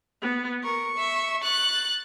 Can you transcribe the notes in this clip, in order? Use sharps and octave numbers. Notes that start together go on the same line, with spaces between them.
B3
A#4 C#6
E5
F#6 A6